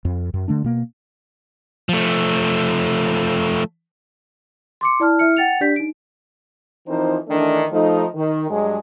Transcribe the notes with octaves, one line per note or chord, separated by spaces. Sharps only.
F2
F#2
D3 A3 D4
B2 A#3
F3 A3
C6 D6 C#7
E4 D5 A5 F6
E4 E5 F6 C#7
F#5 G5 A6 C#7 F7
D4 G4 D5 G6 B6
D#4 D7
E3 F3 C4 D#4 A#4 C5
D#3 E3 A3 D4
F3 A3 D#4
D#3
G2 F#3 G#3